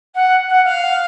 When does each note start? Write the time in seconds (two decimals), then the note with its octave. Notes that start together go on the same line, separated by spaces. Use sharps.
0.14 F#5
0.48 F#5
0.64 F5